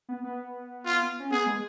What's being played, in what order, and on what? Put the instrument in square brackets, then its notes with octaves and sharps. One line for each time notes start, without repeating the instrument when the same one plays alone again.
[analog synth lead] B3
B3
[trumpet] F4
[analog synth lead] C#4
[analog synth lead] B3 [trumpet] G#4
[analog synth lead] G#3